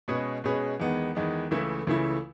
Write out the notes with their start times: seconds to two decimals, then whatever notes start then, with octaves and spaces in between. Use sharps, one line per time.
0.08 B2 G#3 C#4 G#4 B4
0.44 B2 G#3 C#4 G#4 B4
0.80 E2 D#3 G#3 B3
1.15 E2 D#3 G#3 B3
1.51 C#2 C#3 E3 A3 E4
1.87 C#2 C#3 E3 A3 E4